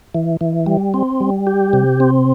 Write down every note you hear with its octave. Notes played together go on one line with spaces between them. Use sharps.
E3
E3
G3
C4
G3
G4
C3
C4